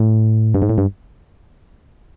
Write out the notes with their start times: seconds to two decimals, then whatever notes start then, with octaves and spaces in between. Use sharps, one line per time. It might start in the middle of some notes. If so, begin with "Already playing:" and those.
Already playing: A2
0.55 G2
0.62 G#2
0.69 A2
0.78 G2